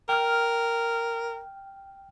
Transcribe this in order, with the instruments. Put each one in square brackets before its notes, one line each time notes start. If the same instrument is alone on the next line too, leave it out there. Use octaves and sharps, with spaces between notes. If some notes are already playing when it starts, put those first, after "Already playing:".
[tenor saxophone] A#4 [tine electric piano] G5 F6